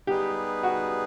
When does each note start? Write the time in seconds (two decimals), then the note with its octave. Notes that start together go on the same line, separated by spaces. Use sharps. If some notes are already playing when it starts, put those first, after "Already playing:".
0.07 G3 B3 D#4 G4 G#4 B4
0.63 F#4